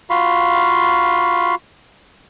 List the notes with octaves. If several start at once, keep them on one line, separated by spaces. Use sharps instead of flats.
F4 F#4 F5 B5